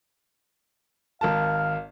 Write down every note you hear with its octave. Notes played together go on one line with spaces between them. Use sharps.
G#1 A#4 F5 A5